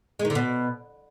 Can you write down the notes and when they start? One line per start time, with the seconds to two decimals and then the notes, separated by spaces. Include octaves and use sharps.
0.19 G#3
0.25 D#3
0.30 D3
0.35 B2